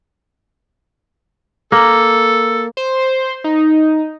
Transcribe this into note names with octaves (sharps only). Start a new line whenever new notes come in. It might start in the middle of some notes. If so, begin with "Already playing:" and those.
A#3 A4
C5
D#4